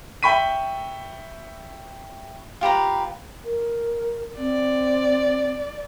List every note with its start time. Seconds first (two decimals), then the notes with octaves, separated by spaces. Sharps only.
0.23 E5 G5 B5 C#6 B6 D#7
2.61 F4 G4 B4 A#5
3.45 A#4
4.37 C4 D5